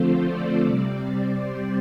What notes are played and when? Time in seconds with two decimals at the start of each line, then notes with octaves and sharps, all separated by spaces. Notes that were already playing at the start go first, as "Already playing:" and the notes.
Already playing: D3 F3 A3 C4 F4 A4 C5
0.28 D5
0.65 C3 G3 C4
1.34 C5